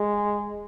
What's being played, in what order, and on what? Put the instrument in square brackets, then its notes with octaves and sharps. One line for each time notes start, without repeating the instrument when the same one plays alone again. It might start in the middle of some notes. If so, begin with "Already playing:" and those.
Already playing: [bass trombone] G#3